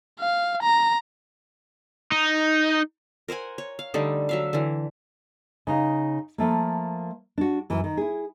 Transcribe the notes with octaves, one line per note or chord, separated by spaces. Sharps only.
F5
A#5
D#4
A#4 C5 F#5 G#5
C#5
F5
D3 G3 A3 D#4
F#3 E5 F5
D3 E3
C#3 D#4 F5
F3 A3 A#3
D4 F#4
F#2 E3
D#3
E4 G#4